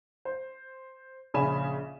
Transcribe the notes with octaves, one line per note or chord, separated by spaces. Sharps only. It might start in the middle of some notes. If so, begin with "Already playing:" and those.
C5
A#1 C#3 C#4 G#5 B5 E7